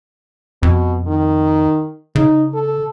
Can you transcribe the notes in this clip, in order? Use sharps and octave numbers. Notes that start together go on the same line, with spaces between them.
F2 B2
D#3
C#3 D#4
A4